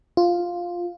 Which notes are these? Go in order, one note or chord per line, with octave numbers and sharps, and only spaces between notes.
F4